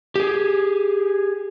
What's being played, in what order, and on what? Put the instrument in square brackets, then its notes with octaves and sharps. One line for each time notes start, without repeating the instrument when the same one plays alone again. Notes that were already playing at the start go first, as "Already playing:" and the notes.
[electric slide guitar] G4 G#4